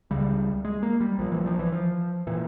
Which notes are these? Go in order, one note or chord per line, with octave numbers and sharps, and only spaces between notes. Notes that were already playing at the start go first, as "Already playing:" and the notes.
C#2 C#3 G3
G#3
A#3
G3
A#1 A#2 F3
E3
F3
E3
F3
A#2 E3